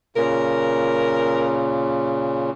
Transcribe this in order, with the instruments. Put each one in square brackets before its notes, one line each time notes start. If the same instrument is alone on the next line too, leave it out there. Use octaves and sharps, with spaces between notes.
[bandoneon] A#2 C#3 [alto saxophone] A#4